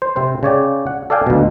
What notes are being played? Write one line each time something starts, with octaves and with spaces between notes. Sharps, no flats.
C5
C3 C4 C5
C#3 C#5 D5 G5
F#5
A4 D5 F5 G5 G#5
D2 B2